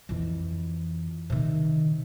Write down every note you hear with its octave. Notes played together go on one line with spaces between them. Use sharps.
F2 E3
C3 D#3